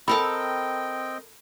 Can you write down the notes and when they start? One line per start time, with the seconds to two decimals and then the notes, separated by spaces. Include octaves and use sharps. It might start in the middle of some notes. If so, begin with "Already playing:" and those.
0.08 C4 A4 A#4 D#5 G5 A5 B5 E6